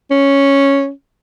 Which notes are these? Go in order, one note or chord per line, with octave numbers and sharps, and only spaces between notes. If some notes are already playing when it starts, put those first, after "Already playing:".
C#4